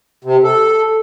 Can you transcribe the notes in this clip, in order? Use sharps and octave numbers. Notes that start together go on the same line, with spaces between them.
C3
A4